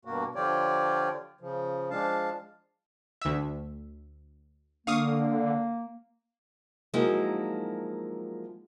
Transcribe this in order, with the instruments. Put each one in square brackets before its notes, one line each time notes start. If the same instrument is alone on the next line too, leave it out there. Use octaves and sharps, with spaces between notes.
[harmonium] G2 B2 A#3 F#4
D3 F3 F4 G4 C#5 D5
C#3 F3
F3 G#3 D4 F5 A5
[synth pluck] D2 E5
[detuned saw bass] D3 [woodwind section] A#3 [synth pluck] F5 C#6 D#6
[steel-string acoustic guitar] F3 F#3 G#3 A#3 D#4 E4